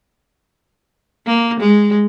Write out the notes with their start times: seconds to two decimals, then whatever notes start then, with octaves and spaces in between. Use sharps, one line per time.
1.26 A#3
1.60 G#3